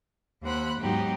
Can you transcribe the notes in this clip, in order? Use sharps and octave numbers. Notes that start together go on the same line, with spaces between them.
D#2 A#3 C5 F#5 B5 F#6
G#2 F#3 B3 D#4 G4